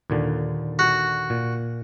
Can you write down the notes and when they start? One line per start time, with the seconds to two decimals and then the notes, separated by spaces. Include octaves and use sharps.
0.10 D#2 A#2 D3
0.79 F#4
1.30 A#2